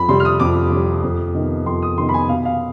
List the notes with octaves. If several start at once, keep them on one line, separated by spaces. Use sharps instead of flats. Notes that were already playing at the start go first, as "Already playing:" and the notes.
Already playing: F2 B5
C3 G3 C6
F6
D#6
F2 D6
C3 G3
F2
C3 D#3 B3 D#4
F2 C6
D#6
C3 D#3 B3 D#4 C6
B5
G#5
B2 F5
F5